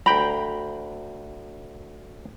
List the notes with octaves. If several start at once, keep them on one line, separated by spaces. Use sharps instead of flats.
D2 G5 A#5 B5